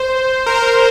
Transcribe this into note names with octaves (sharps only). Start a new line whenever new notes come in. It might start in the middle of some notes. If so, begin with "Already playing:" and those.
Already playing: C5
A#4
C5